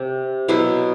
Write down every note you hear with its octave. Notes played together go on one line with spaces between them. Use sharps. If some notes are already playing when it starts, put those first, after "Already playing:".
Already playing: C3
B2 F#3 B3 E4